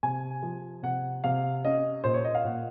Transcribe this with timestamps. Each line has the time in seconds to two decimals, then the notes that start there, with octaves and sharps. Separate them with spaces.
0.03 C3 G#5
0.43 F3
0.83 C3 F#5
1.24 C3 F5
1.65 C#4 D#5
2.04 A#2 C5
2.14 C#5
2.25 D#5
2.35 F5
2.44 A#2 F#5